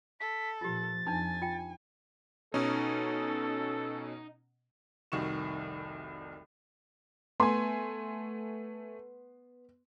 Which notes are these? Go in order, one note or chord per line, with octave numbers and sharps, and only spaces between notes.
A4 B6
A#2 F3 F4 G4 A6
F2 D4 D#4 G#5
F4 G5
B2 C#4 D#4 A4
F1 C2 D#3 F#4 C#6 E7
A3 B3 G#5 C6